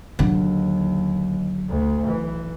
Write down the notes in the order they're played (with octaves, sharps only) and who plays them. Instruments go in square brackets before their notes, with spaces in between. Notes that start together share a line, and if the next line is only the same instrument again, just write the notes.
[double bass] D#2 [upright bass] D3 F#3
[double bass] D2
B1 E3